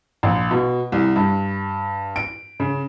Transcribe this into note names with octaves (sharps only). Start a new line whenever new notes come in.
A#1
B2
C2
G2
D7
C#3